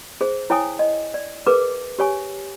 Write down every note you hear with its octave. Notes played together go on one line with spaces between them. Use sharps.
G#4 C5
E4 C#5 G5 G#5 D#6
D#5
D5
G#4 A#4 B4 D6
G4 C#5 G#5